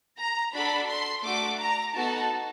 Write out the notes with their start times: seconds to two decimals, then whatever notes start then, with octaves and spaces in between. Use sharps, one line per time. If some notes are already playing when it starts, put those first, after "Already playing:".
0.19 A#5
0.54 D4 F#4 A4 B5
0.89 C6
1.24 A3 D4 F#4 D6
1.60 A#5
1.95 B3 D#4 F#4 A4 A5